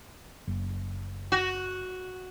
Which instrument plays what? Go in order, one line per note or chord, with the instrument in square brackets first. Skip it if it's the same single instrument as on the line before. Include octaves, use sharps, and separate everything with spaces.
[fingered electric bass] F#1
[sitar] F#4